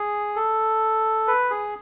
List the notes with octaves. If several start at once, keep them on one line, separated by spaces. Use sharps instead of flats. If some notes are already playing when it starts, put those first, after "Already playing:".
Already playing: G#4
A4
B4
G#4